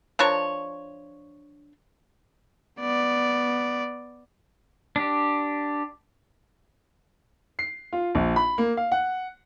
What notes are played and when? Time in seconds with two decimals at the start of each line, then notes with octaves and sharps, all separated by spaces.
0.19 F3 D4 A#4 C#5
2.80 B3 D5
4.96 D4 G4
7.59 C7
7.93 F4
8.15 A#1
8.36 B5
8.58 A#3
8.77 F5
8.92 F#5